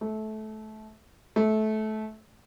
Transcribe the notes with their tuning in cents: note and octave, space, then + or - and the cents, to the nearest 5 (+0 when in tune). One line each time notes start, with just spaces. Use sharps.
A3 -20
A3 -20